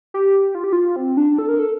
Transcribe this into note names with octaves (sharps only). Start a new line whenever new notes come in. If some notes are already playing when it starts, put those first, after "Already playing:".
G4
F4
G4
F4
C4
D4
A4
A#4
A4